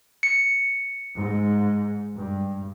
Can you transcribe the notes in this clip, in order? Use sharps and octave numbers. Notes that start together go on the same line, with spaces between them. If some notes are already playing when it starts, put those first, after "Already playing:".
C#7
G#2
G2